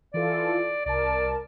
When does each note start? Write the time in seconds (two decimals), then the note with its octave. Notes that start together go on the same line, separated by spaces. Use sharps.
0.14 E3 F4 A4 D5
0.86 C2 A#4 D5 A5